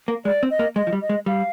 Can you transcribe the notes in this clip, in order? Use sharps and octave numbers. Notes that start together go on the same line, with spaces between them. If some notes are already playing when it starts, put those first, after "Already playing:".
A#3
G#3 D5
C4
D#5
A#3
G#3 D#5
F3
G3
D#5
G#3
G3 F5